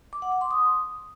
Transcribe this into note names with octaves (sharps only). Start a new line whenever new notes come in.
D6
F#5
D6
C6
D#6